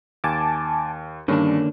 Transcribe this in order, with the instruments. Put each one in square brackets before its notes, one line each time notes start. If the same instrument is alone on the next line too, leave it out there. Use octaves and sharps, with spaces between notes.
[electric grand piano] D#2 [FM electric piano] G#5 A5 D6
[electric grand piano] G2 [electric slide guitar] D3 A#3 D4 [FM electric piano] D#3 C#4